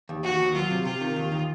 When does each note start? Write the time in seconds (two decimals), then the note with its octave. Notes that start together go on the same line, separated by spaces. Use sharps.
0.09 D#2
0.24 D#2 F#4
0.39 D#2
0.55 F#3 F4
0.71 C3
0.85 C3 F4
1.01 D#3
1.16 D#2
1.32 D#3